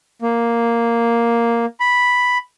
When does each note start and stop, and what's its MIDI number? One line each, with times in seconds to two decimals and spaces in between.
0.22 1.65 58
1.80 2.38 83